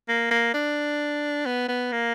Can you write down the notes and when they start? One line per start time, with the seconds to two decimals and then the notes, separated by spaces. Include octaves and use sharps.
0.08 A#3
0.31 A#3
0.54 D4
1.46 B3
1.68 B3
1.92 A#3